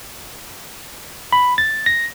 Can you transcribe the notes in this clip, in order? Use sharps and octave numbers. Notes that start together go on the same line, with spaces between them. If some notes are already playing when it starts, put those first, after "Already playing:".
B5
A6
A#6